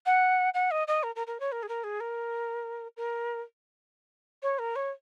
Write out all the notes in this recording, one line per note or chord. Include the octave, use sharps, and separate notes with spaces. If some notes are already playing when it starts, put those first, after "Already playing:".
F#5
F#5
D#5
D#5
A#4
A#4
A#4
C#5
A#4
G#4
A#4
G#4
A#4
A#4
C#5
A#4
C#5